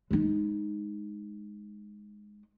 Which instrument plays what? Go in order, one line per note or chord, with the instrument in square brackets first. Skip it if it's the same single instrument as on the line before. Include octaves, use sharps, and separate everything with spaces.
[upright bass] G#3 D#4